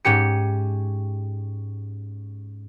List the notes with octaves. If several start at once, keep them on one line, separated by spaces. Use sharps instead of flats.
G#2 C#4 G4 C#7